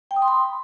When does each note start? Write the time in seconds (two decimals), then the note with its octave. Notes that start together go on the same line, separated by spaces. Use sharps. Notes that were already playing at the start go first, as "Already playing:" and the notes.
0.11 G5
0.16 D#6
0.22 C6
0.28 B5